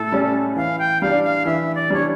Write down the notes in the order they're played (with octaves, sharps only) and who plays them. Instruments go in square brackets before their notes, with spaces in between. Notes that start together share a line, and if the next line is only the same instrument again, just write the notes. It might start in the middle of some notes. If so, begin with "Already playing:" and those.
Already playing: [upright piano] A2 [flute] A4
[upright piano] G3 C#4
[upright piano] E3 [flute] F5
[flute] G5
[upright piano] G3 D4 [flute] F5
[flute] F5
[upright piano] E3 [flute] E5
[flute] D5
[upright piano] G3 D4 [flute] C#5